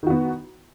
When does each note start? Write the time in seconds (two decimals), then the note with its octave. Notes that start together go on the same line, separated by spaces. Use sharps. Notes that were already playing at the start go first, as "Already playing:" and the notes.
0.03 D#3
0.07 F#4
0.10 B3